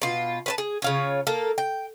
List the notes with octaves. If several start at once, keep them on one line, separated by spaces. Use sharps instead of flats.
B2 F4
B4 C5 A5
G#4
C#3 F4 C#5
A#3 A4
G5